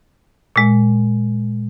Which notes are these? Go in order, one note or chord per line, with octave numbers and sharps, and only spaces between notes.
A#2 G#3